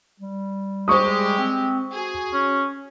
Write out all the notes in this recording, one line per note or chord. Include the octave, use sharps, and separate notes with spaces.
G3
G#3 G4 C5 C#6 D#6
C4
F#4 G#4
C#4